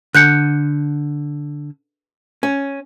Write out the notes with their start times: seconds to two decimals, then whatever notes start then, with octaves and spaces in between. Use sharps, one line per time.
0.15 D3 F#6 G6 C#7
2.43 C#4